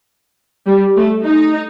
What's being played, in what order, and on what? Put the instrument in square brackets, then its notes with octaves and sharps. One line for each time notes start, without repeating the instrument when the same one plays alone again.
[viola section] G3
A3
D#4